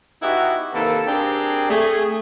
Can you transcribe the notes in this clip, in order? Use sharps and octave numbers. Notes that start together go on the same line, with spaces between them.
B3 D#4 E4 F#4 G4
C3 D#3 A#3 A4 B4
C4 D4 G4 G#4 A#4
A3 G#4